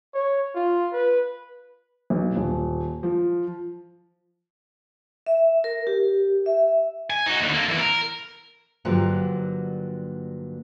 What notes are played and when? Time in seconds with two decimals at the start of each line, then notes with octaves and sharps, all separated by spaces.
0.14 C#5
0.55 F4
0.93 B4
2.10 B1
2.36 D#1
3.03 F3
5.27 E5
5.64 A#4
5.87 G4
6.46 E5
7.10 G#5
7.26 D#4 F#4
7.40 D#2 D3
7.53 A#3 A4
7.68 E2 E4
7.80 A#4
8.85 G2 D3 F3 F#3 A#3